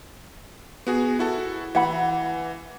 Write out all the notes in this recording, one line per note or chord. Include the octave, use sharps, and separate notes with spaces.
B3 F#4 G#4
E4 F#4 A4
E3 E5 F#5 B5